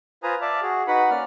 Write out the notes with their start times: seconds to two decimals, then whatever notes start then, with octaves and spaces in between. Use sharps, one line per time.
0.23 F4 B4 C5 G#5 A#5 D#6
0.41 D5 E5 F5 A5 D6
0.62 F#4 G#4
0.87 D#4 F#4 B4 F#5 B5
1.10 A#3 C#4 D5 F6